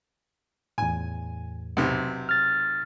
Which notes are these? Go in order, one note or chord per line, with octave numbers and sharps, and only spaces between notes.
E2 A2 G#5
B1 C3
F6 A6